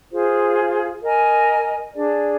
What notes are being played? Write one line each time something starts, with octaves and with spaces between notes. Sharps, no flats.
F4 G#4 C5
A#4 D#5 G#5
D4 G#4 D5